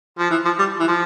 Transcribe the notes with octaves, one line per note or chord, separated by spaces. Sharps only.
F3
E3
F3
G3
E3
F3